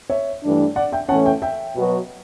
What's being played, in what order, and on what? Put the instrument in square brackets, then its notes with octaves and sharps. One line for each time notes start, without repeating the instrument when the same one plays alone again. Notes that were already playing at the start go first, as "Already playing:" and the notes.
[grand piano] C#5 E5
[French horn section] G2 E3 A3 D4
[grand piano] D5 F#5
E5 G5
[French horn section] A2 E3 A3 C#4 [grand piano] F#5 A5
[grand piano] E5 G5
E5 G5
[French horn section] B2 F#3 B3 F#4 B4